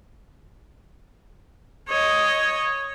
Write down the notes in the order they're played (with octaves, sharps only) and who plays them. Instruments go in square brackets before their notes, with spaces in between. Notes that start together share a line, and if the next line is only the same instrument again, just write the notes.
[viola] C#5 D#5